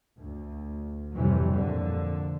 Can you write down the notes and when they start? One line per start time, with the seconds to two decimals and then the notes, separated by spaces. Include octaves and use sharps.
0.17 D2
1.15 F2 A2 C3 E3 F#3 G3
1.51 F2 A#2 D3